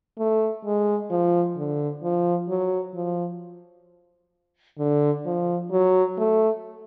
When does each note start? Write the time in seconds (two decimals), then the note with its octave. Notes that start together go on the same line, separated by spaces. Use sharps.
0.18 A3
0.65 G#3
1.10 F3
1.56 D3
2.03 F3
2.49 F#3
2.95 F3
4.79 D3
5.26 F3
5.71 F#3
6.18 A3